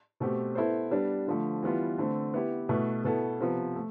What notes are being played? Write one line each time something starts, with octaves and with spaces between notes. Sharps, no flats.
B2 A3 C4 G4
B3 E4 A4 C5
G3 B3 D4
D3 F3 A3
E3 G3 B3 F4
D3 A3 C4
B3 E4 G4
B2 A3 E4 B4
B2 B3 E4 A4
C3 F3 B3
A3